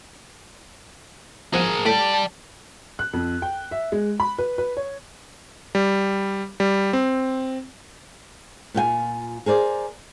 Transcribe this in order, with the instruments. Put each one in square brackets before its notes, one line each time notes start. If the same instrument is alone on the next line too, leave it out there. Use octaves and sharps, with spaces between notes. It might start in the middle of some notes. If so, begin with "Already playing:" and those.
[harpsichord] F3 F#5 [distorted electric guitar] G#4 A#4
[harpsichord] A2 B5 [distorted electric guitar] D5 G5 [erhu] A5
[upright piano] F#6
F2
G5
E5
G#3
B5
B4
B4
C#5
[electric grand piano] G3
G3
C4
[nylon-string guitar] A#2 F4 G5 G#5
G#4 A#4 C5 D5